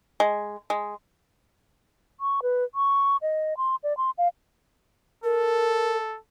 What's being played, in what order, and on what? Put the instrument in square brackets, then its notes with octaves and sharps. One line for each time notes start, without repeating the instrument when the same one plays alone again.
[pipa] G#3
G#3
[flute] C#6
B4
C#6
D#5
C6
D5
C6
F5
[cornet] A4 [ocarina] A#4